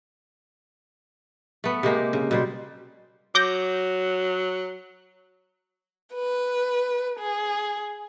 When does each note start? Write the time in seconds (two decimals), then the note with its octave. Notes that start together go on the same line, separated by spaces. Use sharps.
1.64 A3 B3
1.83 C3 G#3 A#3 G4
2.13 C#3
2.31 B2 G3 C5
3.35 F#3 D6 G6 A#6
6.13 B4
7.18 G#4